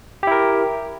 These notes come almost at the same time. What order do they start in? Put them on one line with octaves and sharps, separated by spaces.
G4 E4 A#4